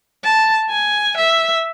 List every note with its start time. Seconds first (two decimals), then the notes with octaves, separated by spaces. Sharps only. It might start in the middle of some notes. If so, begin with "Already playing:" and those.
0.24 A5
0.70 G#5
1.17 E5